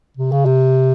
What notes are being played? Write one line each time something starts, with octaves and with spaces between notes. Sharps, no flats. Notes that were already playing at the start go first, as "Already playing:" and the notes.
C3
C#3
C3